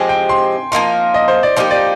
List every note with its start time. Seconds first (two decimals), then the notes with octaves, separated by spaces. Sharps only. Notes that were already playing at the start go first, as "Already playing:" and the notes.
Already playing: F3 G#3 C4 G4 G#5
0.09 G5
0.29 C6
0.72 F3 A#3 D#4 A#4 C6
1.14 D#5
1.28 C5
1.43 D5
1.56 F3 A#3 D#4 G4 C5
1.71 D5